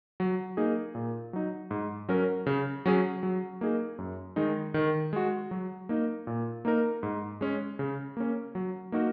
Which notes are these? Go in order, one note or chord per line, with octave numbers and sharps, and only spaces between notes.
F#3
A#3 D#4 G#4
A#2
F#3 D#4
G#2
F#3 C#4 A#4
C#3
F#3 C#4 G#4
F#3
A#3 D#4 G#4
F#2
D#3 G#3 D#4
D#3
G#3 F#4
F#3
A#3 D#4
A#2
A#3 D#4 A#4
G#2
G#3 C#4
C#3
A#3 C#4
F#3
A#3 D#4 F#4 A#4